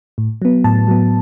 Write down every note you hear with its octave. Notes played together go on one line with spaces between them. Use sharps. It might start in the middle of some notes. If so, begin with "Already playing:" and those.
A2
F#3 B3
A2 A5
F#3 B3